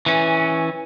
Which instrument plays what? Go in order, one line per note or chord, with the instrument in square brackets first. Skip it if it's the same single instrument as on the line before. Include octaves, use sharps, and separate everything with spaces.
[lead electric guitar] E3 C#4